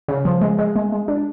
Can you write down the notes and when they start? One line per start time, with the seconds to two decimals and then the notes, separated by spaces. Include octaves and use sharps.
0.08 C#3
0.25 F3
0.41 G#3
0.59 G#3
0.76 G#3
0.92 G#3
1.08 D4